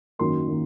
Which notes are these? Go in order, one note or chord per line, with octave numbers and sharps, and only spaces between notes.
F#2 D#3 F#3 A#3 C6
D#3 F#3 A#3